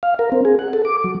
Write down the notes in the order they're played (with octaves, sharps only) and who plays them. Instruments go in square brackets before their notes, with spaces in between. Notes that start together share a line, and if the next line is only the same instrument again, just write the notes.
[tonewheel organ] F5
A#4
C4
G#4
F#5
A4
D6
F#3